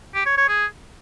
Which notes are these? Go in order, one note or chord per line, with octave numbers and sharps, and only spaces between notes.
G4
C#5
C#5
G#4